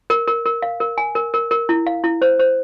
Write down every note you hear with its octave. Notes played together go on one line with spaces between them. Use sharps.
A#4
A#4
A#4
F5
A#4
G#5
A#4
A#4
A#4
E4
F5
E4
C5
C5